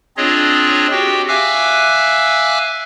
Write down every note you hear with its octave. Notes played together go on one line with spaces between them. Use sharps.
C4 D4 F4 G#4 C#5 D#5
F#4 G4 G5
E5 F5 G#5 D6 E6 F#6